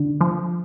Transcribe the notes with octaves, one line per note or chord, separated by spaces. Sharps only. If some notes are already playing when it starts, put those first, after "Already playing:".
Already playing: D3
F3